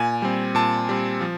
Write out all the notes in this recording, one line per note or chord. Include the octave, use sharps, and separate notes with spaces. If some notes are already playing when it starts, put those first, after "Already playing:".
Already playing: A#2 G#5
G3 C4
A#2 A5
G3 C4
F3